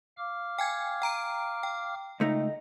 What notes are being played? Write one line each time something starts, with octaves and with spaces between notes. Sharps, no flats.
F5 D6 F6
G5 G#5 G#6
G5 A#5 D7
G5
C#2 A3 D#4 D#5